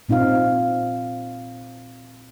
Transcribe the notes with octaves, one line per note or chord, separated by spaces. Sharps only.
A#2 C4 D#4 F4 F5